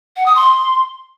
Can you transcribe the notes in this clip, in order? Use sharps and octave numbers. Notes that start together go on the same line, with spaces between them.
F#5
D#6
C6